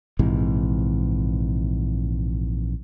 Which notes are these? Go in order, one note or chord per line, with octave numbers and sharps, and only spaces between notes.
A#1 G#2 C3 E3